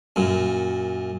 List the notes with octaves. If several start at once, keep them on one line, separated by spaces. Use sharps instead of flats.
F#2 A#2